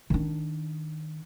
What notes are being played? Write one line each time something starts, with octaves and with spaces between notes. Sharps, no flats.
D#3 D4